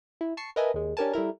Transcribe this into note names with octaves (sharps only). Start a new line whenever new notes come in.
E4
A5 C#6 C7 C#7
A#4 B4 D#5 E5 G#5 A5
D#2 G#3
C#4 D4 G4 A#4 G#5 A5
G3 A3 E4 A#4